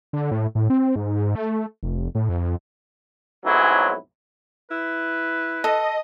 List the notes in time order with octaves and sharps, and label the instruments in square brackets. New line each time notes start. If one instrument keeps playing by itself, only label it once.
[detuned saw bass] D3
A2
A2
C4
G#2
A3
F1
A2
F2
[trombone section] B1 F2 G#2 F#3 C#4 E4
[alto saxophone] E4 [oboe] B4
[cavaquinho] A4 [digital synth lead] D#5